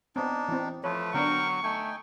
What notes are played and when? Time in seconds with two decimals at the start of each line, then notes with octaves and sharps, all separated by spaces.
0.16 B3 C4 D4 D#4
0.48 E3 C4
0.84 F3 A3 B4 C#5
1.14 D3 F#3 B3 D4 A#4 G5 C#6
1.64 A3 D#4 G5 G#5